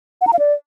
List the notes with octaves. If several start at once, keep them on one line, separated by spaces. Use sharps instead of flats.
F#5
A#5
F5
D5